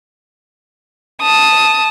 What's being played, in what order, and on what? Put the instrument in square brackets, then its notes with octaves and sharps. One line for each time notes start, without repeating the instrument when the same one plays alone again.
[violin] A5 D#6